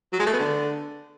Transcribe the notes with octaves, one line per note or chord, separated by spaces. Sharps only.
F#3
G#3
A3
B3
D3